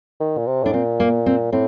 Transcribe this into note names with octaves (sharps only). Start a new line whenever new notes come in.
D#3
A#2
C3
A2 D4
A#2 C4
A#3
C4
A2 C4